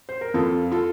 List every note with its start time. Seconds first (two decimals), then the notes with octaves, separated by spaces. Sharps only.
0.09 C5
0.21 A#4
0.34 F2 F4 A4
0.72 F4 A4